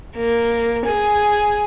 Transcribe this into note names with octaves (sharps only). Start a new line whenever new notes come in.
A#3
G#4